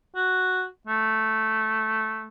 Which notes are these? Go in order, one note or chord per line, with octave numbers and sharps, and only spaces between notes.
F#4
A3